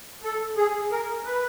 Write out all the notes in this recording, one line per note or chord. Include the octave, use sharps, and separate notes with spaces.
A4
G#4
A#4
B4